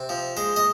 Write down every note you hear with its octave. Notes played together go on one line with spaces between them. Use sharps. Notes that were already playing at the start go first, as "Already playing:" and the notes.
Already playing: C3
F3
G#3 C5
D#5